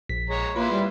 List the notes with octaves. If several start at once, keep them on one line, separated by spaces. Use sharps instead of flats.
A#1 B6
G#3 C#5 A#5
A#3 E4 F4 B4 C6
G3